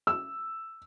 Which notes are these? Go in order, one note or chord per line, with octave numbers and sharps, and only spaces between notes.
E6